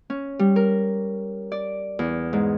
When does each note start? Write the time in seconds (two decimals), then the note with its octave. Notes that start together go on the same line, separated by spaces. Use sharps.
0.10 C#4
0.39 G3
0.56 A#4
1.52 D5
1.99 E2
2.33 G#2